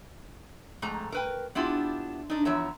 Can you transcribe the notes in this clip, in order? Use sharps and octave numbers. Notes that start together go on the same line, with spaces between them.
F2 G#2 A3 A#5
A#4 B4 G5
B3 D4 E4 F4 G4
D4 D#4
E2 F3 C#5 E5 A#5